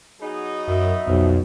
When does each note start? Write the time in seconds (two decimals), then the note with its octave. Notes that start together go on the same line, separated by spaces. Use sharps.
0.20 F#3 B3 D#4 G#4
0.68 F#2 E5
1.07 B1 F2